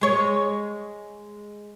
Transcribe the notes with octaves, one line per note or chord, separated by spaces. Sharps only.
G#3 C#5